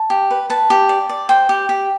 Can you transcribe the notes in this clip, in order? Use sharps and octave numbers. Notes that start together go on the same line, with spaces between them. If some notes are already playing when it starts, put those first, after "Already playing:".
Already playing: A5
G4
B4
B4 A5
G4
D5
D5
C5 G5
G4
G4